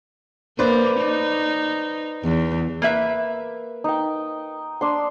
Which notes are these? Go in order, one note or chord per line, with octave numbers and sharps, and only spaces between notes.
A#3 B4 C5 D5
D#4
E2
A#3 B4 E5
D#4 G5
D4 C6